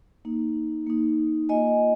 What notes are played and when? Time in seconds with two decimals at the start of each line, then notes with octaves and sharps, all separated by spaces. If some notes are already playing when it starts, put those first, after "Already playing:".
0.25 A#3 D#4
0.87 A#3 D#4
1.49 A#3 F4 D#5 G#5